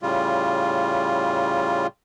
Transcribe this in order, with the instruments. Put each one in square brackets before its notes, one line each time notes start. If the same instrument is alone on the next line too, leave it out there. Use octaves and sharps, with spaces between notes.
[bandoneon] A2 C#3 G3 F4